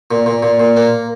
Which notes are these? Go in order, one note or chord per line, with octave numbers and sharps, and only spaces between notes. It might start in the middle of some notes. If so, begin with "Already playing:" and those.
A#2
A#2
A#2
A#2
A#3